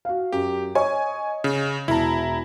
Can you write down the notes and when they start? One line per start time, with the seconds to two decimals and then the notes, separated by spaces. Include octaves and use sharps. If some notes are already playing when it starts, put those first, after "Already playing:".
0.05 F#4 F5
0.32 F#2 G4
0.75 C#5 D#5 G#5 C#6
1.44 C#3
1.88 E1 E4 A5 A#5